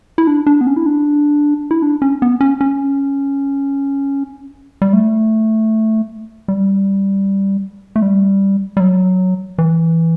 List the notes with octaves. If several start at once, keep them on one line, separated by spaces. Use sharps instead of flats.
E4
D4
D4
B3
C#4
E4
D4
E4
D4
C#4
B3
C#4
C#4
G3
A3
G3
A3
G3
G3
F#3
E3